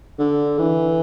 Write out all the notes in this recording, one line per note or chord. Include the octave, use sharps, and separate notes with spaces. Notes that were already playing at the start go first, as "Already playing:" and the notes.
D3
E3